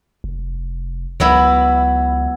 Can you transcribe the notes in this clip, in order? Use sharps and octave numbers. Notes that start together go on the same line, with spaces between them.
F1
C#2 F#3 B3 E4